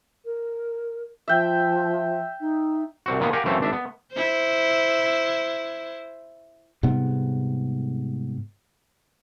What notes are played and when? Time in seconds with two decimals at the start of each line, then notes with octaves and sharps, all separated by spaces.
0.25 A#4
1.28 F3 E5 G5
2.40 D#4
3.06 C2 C4 F#4
3.20 A#2 D#3 A#3 B3
3.33 G4 A#4 F5 F#5 G#5
3.45 F#2 E3 A3 C4 E5 F5
3.60 G#1 D4 E5
3.73 B3
4.13 E4 C5
6.83 G#2 C3 G3 B3